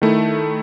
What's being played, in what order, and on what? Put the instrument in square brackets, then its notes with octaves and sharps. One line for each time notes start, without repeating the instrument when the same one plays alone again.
[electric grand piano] D#3 A3 E4